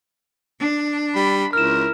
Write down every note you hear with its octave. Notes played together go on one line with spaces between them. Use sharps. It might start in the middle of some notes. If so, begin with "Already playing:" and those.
D4
G3 B5
C#2 E4 A#4 F6 E7